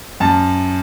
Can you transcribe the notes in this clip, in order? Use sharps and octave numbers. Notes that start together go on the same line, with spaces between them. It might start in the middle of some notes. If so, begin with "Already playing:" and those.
F#2 A5